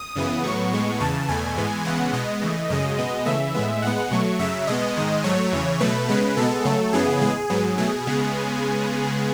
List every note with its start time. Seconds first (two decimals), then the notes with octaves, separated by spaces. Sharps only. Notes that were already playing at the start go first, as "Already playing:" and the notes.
Already playing: D#6
0.16 F#2 C#3 E3 B3
0.44 A2 F#3 B3 C#6
0.73 A2 G#3 B3
1.00 E2 C#3 E3 A5
1.29 E2 B2 A3 G#5
1.56 G#2 E3 G#3 B3
1.85 C#3 E3 G#3 B3 F#5
2.13 B2 G#3 B3 D#5
2.41 C#3 E3 A3
2.70 F#2 C#3 G#3 D#5
2.98 B2 G#3 B3
3.26 C#3 E3 A3 E5
3.54 A2 G#3 B3
3.82 A2 G#3 B3 F#5
4.11 B2 F#3 A3 C#6
4.39 F#2 C#3 F#3 E5
4.67 B2 G#3 B3 D#5
4.96 G#2 D#3 G#3
5.24 G#2 F#3 A3 C#5
5.52 E2 C#3 E3
5.80 B2 F#3 A3 B4
6.08 C#3 G#3 B3
6.37 B2 G#3 B3 A4
6.65 C#3 F#3 A3
6.93 F#2 C#3 E3 B3 G#4
7.22 A2 G#3 B3
7.50 G#2 F#3 B3 G#4
7.78 B2 F#3 A3 G#4
8.07 C#3 G#3 B3